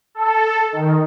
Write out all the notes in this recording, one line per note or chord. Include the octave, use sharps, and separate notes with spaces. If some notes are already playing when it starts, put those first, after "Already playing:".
A4
D#3